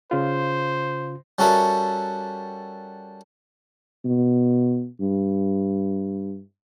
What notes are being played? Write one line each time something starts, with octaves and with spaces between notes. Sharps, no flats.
C#3 F4 C5
G3 C#4 F#4 A4 A#4 E5
B2
G2